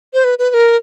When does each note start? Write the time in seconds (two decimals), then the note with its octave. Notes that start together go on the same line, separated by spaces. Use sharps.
0.14 C5
0.24 B4
0.39 B4
0.51 B4
0.54 A#4